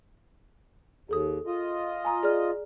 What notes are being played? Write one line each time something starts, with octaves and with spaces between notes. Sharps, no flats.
D#2 G#4 A4 D#6
F4 D#5
G#5 A#5 D#6
G#4 D5 F6